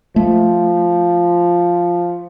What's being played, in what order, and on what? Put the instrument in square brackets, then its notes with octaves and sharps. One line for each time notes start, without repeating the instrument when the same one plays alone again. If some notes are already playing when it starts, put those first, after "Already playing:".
[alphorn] F3 [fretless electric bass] A3